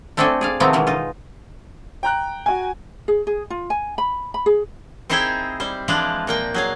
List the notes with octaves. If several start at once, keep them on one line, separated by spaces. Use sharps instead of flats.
A3 C4 D4 A4 G5 G#5
G#4 D5 F5
C3 D#3 F3 A3 B3 C4
B2 D#3 E3 G#3
D#4 F4
G5 A#5 F#6
F#4 G#5
G#4
G#4
F4
G#5
B5
B5
G#4
C4 D#4 E4 G#4 C5 G5
G3 C5
E3 F3 G#3 D4 F4 D5
A#2 A#3 G5
F#3 G#4 F5